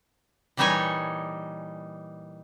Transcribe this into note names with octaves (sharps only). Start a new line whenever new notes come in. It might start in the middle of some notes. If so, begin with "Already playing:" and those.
A#2 E3 G3 D#4 C#5 G#5